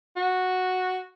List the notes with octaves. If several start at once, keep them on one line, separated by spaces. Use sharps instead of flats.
F#4